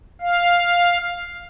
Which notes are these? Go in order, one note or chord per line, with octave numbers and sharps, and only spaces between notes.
F5